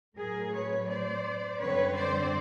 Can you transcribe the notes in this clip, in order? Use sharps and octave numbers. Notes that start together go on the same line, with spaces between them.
A2 F#3 A3 C4 G#4 A#4
B4 C#5
C5 D5
F#2 D3 G3 C4 B4 C#5
C5 D5